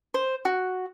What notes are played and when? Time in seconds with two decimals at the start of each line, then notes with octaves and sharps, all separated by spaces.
0.14 C5
0.45 F#4